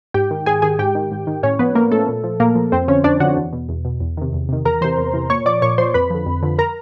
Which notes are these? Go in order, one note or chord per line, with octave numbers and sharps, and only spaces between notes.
G#2 G4 G5
D#3
G#2 G#4 G#5
D#3 G#4 G#5
G#2 G4 G5
D#3
G#2
D#3
A2 C#4 C#5
F3 B3 B4
A2 A#3 A#4
F3 A3 A4
A#2
F3
A#2 A#3 A#4
F3
F2 C4 C5
D3 F3 C#4 C#5
F2 D4 D5
D3 F3 F#4 F#5
E2
B2
E2
B2
E2
C3 D#3
E2
C3 D#3
E2 A#4 A#5
C3 E3 C5 C6
E2
C3 E3
A#2 C#5 C#6
F3 D5 D6
A#2 C#5 C#6
F3 C5 C6
F2 B4 B5
D3 F3
F2
D3 F3
A#4 A#5